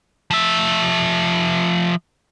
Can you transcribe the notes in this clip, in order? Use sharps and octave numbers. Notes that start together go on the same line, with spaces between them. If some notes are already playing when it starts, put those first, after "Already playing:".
F3 E5